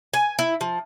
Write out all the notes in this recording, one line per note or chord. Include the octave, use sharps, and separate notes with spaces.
G#5
E4
F3